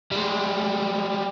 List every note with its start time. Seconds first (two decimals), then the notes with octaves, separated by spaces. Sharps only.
0.11 G3 G#3